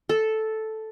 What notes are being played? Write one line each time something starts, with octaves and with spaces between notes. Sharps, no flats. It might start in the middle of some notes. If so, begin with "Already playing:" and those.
A4